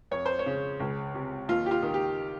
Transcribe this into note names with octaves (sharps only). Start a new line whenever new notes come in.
F2 C#5
C5
C#5
C#3
C#2
C3
D#2 F4
G4
F4
D#3
G4